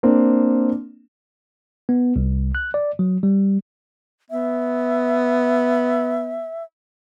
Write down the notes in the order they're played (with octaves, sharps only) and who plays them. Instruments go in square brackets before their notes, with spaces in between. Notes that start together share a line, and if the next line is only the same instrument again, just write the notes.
[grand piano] A#3 C4 D4
[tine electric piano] B3
C2
F#6
D5
F#3
G3
[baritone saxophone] B3 [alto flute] E5